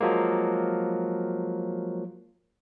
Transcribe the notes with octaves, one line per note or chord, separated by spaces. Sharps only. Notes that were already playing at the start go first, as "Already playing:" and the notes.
F3 F#3 G#3 A#3